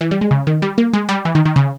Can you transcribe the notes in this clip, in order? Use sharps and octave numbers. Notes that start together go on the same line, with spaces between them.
E3
G3
G#3
C#3
D#3
G3
A#3
G#3
G3
E3
D#3
D#3
C#3